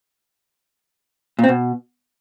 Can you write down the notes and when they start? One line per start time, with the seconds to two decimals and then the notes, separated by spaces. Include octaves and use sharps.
1.39 A#2
1.44 C4
1.49 B2